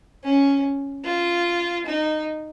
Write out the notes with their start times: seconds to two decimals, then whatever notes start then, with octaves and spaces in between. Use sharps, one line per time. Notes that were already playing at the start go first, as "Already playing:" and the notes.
0.24 C#4
1.05 F4
1.86 D#4